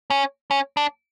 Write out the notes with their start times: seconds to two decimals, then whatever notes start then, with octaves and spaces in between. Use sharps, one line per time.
0.10 C#4
0.51 C#4
0.77 D4